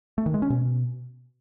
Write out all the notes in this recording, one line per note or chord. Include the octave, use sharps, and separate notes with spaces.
A3
D#3
G#3
C#4
B2